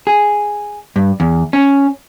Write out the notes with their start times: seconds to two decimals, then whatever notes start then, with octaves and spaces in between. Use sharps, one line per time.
0.07 G#4
0.96 G2
1.20 E2
1.53 C#4